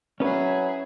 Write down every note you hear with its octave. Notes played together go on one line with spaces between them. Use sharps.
F#3 C#4 E4 G#4 B4